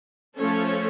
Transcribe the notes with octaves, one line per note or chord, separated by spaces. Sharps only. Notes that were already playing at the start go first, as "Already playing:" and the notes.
F3 A3 C#4 A4 C#5